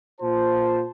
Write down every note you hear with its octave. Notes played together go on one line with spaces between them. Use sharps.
A#2 F4 C5 A5